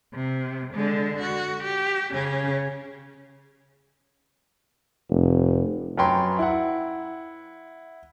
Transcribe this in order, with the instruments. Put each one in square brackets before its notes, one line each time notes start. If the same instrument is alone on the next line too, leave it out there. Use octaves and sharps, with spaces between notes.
[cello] C3
D3 G#3
F#4
G4
C#3 C#4
[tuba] F1
[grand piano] F#2 B4 C#5 G5 A#5 C6
E4 F#5